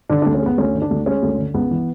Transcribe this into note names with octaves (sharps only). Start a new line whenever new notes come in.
D3 D4
D4
D2
C#4
G#3 B3
D2 C#4
D3
D4
D2
G#3 C#4
D2
D3
C#2 B3
E3